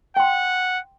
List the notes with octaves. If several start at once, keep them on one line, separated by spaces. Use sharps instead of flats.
F#5 G5 C6